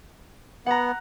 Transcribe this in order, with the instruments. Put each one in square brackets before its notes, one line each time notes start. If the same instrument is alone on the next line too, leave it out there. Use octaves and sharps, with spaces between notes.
[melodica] B3 [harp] F#5 A#5